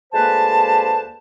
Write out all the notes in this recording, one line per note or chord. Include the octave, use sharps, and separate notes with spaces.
D2 G#3 A#3 B4 C5 A5